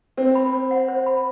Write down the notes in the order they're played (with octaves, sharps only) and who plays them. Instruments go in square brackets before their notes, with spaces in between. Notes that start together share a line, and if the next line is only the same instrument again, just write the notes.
[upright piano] C4 [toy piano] C5
[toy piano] B5
C5
F#5
C5
B5